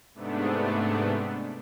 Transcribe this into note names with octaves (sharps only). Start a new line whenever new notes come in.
G#2 C3 A3 B3 D4